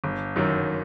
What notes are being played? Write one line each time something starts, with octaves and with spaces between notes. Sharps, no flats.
G1
F#2 D#3 F#3